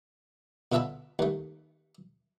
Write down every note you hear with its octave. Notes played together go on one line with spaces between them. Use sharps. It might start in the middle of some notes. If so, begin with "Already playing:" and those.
B2 D3 F4 E5 A5 B5
D#2 A3